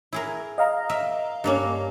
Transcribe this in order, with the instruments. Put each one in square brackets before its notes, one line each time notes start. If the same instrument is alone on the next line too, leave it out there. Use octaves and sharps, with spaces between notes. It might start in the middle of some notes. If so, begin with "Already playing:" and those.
[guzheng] E4 G#4 A#4
[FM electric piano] D#5 F5 A#5
[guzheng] A#4 E5
G2 A#3 C#4